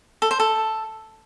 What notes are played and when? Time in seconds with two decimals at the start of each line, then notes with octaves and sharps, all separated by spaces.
0.22 A4
0.31 C5
0.40 A4